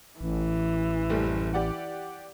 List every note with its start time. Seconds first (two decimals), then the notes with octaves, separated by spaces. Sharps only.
0.21 A1 E3
1.10 F#1 G3 A3
1.54 G4 D5 F#5